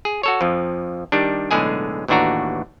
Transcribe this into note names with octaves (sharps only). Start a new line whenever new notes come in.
G#4
F#4 A4 C#5
F2 F3
D#3 G3 D4
B1 A2 D3 G#3 G#4 G#5
A1 D#2 E3 D4 F#4 A#5